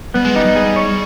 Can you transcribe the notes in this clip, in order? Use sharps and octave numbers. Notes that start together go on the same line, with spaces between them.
G3 B3
G#3
G3 D#4
G3
G#4
C#5